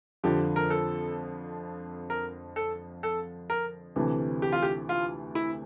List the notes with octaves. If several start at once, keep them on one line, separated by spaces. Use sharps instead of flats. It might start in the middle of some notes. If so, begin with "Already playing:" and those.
F2 D3 F3 G4
A#4
A4
A#4
A4
A4
A#4
D2 C3 E3 A3
G4
F4
G4
F4
E4